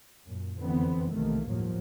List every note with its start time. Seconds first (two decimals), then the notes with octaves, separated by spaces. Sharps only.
0.24 F#2 A#2
0.60 F#1 F2 D3 E3 B3 C4
1.11 B1 C3 D#3 E3 A3 A#3
1.47 G1 D#2 A2 F3 F#3